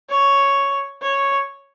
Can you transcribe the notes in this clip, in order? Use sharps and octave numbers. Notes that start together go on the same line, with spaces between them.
C#5
C#5